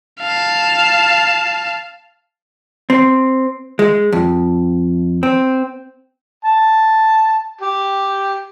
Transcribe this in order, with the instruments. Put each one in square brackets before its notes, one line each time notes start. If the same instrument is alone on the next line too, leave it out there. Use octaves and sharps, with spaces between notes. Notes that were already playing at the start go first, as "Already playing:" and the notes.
[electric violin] F5 A5
[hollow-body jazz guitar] C4
G#3
F2
C4
[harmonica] A5
G4